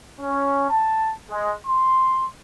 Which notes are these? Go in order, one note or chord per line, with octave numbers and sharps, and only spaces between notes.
C#4
A5
G#3
C6